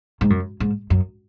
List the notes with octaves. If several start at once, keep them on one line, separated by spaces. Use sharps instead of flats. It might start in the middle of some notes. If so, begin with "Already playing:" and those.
G#2
F#2
G#2
F#2